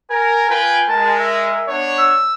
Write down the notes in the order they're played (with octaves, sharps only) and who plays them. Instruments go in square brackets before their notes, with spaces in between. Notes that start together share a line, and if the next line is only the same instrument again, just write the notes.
[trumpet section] A#4 [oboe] G#5
[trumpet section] F4 B4 G5
[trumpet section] G#3 A#4 [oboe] A5
[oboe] E5
[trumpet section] B3 D4 C#5
[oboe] E6